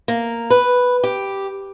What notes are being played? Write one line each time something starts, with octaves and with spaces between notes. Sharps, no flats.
A#3
B4
G4